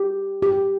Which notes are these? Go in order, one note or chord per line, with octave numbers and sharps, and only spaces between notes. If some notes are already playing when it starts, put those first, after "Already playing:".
Already playing: G4
G4